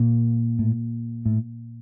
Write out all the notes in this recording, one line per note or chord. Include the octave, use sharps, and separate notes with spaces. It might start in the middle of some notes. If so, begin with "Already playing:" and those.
Already playing: A#2 A#3
A2
A2